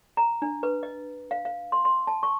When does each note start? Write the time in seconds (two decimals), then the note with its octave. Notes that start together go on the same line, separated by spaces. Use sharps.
0.17 A#5
0.42 D4
0.63 B4
0.83 D#5
1.31 F5
1.45 F5
1.72 C6
1.85 C6
2.07 A5
2.23 C#6